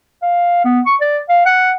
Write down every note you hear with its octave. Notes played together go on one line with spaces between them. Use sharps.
F5
B3
C#6
D5
F5
F#5